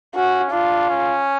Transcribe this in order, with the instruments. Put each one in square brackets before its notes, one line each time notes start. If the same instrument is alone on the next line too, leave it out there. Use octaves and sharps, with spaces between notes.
[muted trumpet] C#4 [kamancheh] F#4
[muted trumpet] D4 [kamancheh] F4
[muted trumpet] C#4